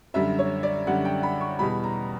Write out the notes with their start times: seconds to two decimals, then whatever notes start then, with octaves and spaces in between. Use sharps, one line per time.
0.14 F#2 D3 G3 E5
0.39 C#5
0.63 D5
0.87 F#2 D3 G3 F#5
1.05 G5
1.23 B5
1.41 C#6
1.59 E2 B2 G3 B5
1.84 A#5